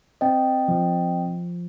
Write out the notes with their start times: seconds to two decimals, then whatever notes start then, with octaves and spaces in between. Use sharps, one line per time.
0.21 C4 D#5 G5
0.68 F3